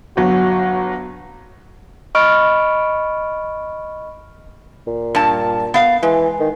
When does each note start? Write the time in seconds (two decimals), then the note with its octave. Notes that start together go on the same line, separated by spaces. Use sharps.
0.17 G1 F#3 F#4
2.15 D#5 B5 C#6 F6 D7
4.87 A#2
5.15 G2 A5
5.74 B3 F5
6.03 E3 G#3
6.40 D#3